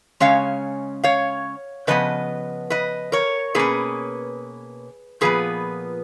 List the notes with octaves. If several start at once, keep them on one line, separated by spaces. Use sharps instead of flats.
C#3 G#3 C#4 C#5 F5
C#5 F5
C#3 F3 B3 B4 D#5
B4 D#5
A#4 C#5
B2 A#3 C#4 G#4 B4
A#2 F3 B3 G#4 B4